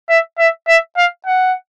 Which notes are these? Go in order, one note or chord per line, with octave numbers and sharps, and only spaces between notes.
E5
E5
E5
F5
F#5